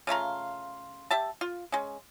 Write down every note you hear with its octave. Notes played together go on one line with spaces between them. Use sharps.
C#3 A3 F4 A#5
G4 E5 A5
F4
G#3 C#4